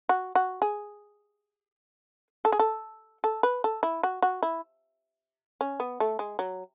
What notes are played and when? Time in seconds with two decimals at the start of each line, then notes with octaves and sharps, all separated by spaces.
0.09 F#4
0.35 F#4
0.62 G#4
2.45 A4
2.52 G#4
2.59 A4
3.24 A4
3.43 B4
3.64 A4
3.83 E4
4.03 F#4
4.22 F#4
4.43 E4
5.61 C#4
5.80 B3
6.00 A3
6.19 G#3
6.39 F#3